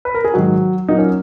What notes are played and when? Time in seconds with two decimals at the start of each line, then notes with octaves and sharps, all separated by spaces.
0.05 B4
0.14 A#4
0.25 G#4
0.34 G#2 D#3 F#3 F#4
0.88 A#2 F#3 A#3 D#4
0.98 C#4